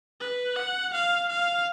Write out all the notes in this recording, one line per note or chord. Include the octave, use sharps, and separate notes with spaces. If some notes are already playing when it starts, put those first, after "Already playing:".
B4
F#5
F5
F5